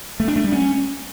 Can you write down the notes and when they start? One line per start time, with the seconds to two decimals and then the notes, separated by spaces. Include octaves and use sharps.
0.20 A3
0.28 D4
0.36 A3
0.44 G3
0.52 C#4